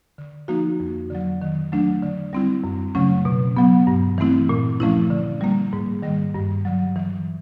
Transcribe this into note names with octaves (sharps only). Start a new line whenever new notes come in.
D3
F3 A#3 D#4 F#4
F2
D3 F#3
D#3
F#3 A3 D4
D3
G3 C4 E4
F#2
C#3 F#3 A3 C#4
B2
F#3 B3
G2
E3 A3 C4 E4
A#2
F3 A3 C#4 E4
D3
G3 A#3
G#2
D#3 G3
G2
D3 F#3
E3